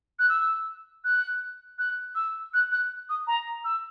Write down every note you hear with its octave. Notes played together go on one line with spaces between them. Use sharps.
F#6
E6
F#6
F#6
E6
F#6
F#6
D#6
A#5
E6